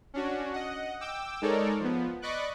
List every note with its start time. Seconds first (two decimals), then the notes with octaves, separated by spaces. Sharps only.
0.14 C#4 D4 F#4
0.53 D#5 F#5
1.01 G5 D6 E6
1.42 G#3 D#4 A4 A#4 C#5 D5
1.80 F3 B3
2.22 D5 D#5 B5 C#6 D6 F#6